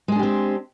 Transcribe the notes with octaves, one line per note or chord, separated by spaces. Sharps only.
G#3 C4 D4 G4 G#4